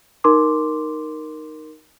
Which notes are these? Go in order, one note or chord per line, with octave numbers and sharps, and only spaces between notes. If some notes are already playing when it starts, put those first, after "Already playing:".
D#4 A#4 C6 D6